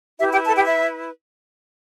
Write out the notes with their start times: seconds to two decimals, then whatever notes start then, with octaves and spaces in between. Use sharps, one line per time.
0.19 E4 G4 B4 E5
0.33 G4 G5
0.47 A4 A5
0.56 G4 G5
0.66 E5